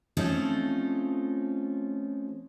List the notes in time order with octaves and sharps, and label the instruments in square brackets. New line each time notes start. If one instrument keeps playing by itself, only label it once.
[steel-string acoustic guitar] F3 A3 C4 C#4 D#4 F4